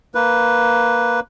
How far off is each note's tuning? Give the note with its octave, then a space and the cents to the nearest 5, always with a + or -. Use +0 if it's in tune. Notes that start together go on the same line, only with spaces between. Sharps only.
A#3 +0 B4 +0